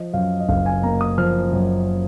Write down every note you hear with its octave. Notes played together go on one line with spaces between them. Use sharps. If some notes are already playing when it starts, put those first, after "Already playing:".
Already playing: F3 D#5
F#2 F5
D#5
F#1 F5
G#5
A#3 A#5
D#6
F3 F6
F#2